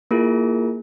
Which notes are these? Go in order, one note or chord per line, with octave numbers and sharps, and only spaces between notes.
A#3 E4 F4 G#4 A#4